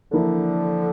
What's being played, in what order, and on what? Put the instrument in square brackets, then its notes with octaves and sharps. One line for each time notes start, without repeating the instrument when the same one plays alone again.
[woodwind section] D3 F3 [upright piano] E3 A#3 E4 A#4 D5